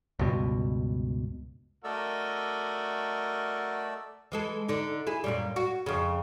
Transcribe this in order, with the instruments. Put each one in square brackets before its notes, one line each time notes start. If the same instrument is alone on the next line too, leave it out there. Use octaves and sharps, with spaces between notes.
[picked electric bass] C#2 G2 B2
[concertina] A3 D5 E6 [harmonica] F#4 A#4 D#5
[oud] E3 G#3 A4
D3 D#4
E4 G#4
F#2 A#2 G3
F#4
F2 C#3